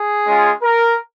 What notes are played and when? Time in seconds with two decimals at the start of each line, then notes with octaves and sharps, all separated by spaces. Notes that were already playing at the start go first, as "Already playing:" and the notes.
Already playing: G#4
0.26 G#3 C#4 F4
0.63 A#4